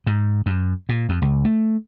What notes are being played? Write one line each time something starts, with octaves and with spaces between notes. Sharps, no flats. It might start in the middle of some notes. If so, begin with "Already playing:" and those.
G#2
F#2
A#2
F2
C#2
A3